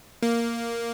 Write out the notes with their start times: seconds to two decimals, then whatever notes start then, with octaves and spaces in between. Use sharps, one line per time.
0.23 A#3